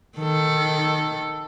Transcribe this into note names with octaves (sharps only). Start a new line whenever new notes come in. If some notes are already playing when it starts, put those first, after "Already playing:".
D#3 A4